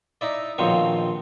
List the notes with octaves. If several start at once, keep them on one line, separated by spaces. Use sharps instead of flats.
D#4 E4 D5
A#1 B2 D#3 F3 C4 C#5